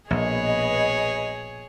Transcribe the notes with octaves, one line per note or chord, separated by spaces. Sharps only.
A#1 B2 G#4 B4 C#5 D#5